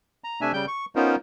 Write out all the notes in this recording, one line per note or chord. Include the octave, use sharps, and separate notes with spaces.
A#5
C3 A3 D4 E5 G#5
C#3 G3 G5 G6
C#6
B3 C#4 D#4 F4 A#4 C5